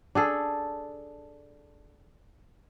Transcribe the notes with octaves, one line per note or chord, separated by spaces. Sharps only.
D4 G#4 A4